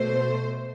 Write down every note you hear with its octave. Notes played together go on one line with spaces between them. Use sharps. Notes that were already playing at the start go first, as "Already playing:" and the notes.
Already playing: B2 A3 C5